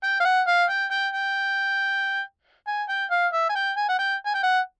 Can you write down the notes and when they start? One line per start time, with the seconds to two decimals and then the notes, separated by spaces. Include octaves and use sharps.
0.03 G5
0.20 F5
0.25 F#5
0.47 F5
0.69 G5
0.91 G5
1.13 G5
2.67 G#5
2.89 G5
3.11 F5
3.33 E5
3.49 G#5
3.55 G5
3.77 G#5
3.89 F#5
3.99 G5
4.26 G#5
4.34 G5
4.43 F#5